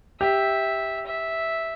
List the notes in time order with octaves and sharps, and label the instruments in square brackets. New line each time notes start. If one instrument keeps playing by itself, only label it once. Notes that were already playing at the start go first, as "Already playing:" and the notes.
[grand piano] G4 [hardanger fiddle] E5
[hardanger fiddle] E5